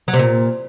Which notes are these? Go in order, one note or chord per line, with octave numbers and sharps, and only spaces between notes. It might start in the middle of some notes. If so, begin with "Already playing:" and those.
F#3
C3
A#2